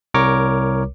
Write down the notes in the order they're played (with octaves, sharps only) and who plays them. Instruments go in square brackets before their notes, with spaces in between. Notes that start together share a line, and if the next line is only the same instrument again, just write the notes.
[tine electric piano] C2 A#4 C#5 D6